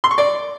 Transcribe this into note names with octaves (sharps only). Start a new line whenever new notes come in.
C6
C#6
D5